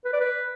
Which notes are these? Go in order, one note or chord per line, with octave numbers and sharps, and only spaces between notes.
B4
D5
B4